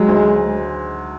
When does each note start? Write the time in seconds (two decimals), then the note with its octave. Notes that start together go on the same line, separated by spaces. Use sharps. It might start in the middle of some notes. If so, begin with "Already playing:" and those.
Already playing: F#3 G#3
0.08 D2